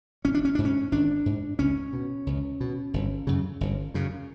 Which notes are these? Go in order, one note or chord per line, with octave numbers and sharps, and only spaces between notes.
G#1 C#4
D4
C#4
G#2 D4
C#4
G#1 D4
G#2
C#2 C#4
B2
C#2
B2
G1
F#2 C#3
G1
F#2 C#3